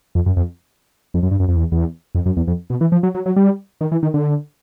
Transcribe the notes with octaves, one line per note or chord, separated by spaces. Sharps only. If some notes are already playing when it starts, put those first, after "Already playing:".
F2
F#2
F2
F2
F#2
G2
F#2
F2
E2
E2
F2
F#2
E2
F2
B2
E3
F3
F#3
F#3
F#3
G3
D#3
E3
D#3
D3